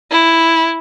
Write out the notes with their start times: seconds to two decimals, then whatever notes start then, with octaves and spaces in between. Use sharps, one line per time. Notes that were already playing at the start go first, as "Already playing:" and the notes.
0.11 E4